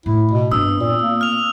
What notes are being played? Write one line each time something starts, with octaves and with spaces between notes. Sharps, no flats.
A2 E4
B2
G2 B3 C4 D#6 E6
A#2
A#3
F6 F7